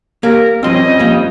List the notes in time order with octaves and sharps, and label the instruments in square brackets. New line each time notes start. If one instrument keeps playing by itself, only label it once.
[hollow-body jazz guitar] A#3 G4 [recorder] A#4
[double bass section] F3 G3 C#4 [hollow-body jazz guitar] C4 C6 [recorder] D#5
[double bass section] F2 [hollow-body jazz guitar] G3 A#3